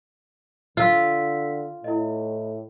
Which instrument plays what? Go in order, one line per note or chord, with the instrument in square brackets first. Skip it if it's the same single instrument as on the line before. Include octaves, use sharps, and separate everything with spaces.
[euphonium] D3 [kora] F4 [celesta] E6 B6
[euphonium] A2 [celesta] E4 D#5